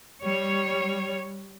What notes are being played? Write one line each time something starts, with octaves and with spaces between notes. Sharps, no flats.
G3 C#5